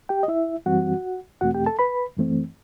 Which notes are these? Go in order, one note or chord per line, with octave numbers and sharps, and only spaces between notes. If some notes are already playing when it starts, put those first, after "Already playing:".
G4 G5
D#5
E4 E5
F#2 E3 G3 C4 F#4 F#5
E2 B2 A3 C4 F#4 F#5
G4 G5
A4 A5
B4 B5
F#2 E3 A3 C4